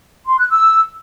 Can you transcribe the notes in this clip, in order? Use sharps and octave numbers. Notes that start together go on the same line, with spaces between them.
C6
F#6
E6